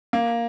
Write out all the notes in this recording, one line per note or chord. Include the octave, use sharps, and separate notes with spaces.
A#3